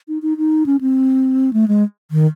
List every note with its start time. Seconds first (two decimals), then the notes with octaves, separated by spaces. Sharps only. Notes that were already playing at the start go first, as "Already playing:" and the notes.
0.08 D#4
0.22 D#4
0.38 D#4
0.66 C#4
0.81 C4
1.53 A3
1.68 G#3
2.11 D#3